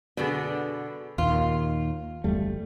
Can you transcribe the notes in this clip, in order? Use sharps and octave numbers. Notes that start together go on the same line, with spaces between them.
B2 D3 B3 G#4 D5
D#2 A#2 D#3 F4
G1 E2 G3 A3